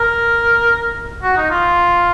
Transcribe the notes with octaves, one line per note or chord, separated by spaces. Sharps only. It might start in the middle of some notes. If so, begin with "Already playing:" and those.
Already playing: A#4
F#4
D#4
F4